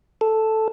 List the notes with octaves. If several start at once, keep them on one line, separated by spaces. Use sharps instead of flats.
A4